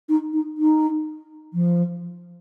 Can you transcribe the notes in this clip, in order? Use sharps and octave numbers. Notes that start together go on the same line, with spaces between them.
D#4
D#4
D#4
F3